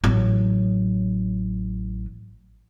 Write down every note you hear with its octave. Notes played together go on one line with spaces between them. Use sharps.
A1 F#3